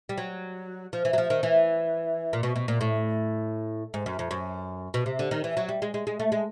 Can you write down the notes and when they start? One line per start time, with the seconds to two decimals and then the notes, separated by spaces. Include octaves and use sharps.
0.09 G3
0.18 F#3
0.93 F3
1.05 E3
1.13 F#3
1.18 F3
1.30 D#3
1.43 E3
2.33 A#2
2.43 B2
2.56 B2
2.68 A#2
2.81 A2
3.94 G#2
4.06 F#2
4.19 F2
4.31 F#2
4.94 B2
5.06 C3
5.19 D3
5.31 D#3
5.44 E3
5.57 F#3
5.69 G3
5.82 G#3
5.94 G#3
6.07 G#3
6.20 A3
6.32 G#3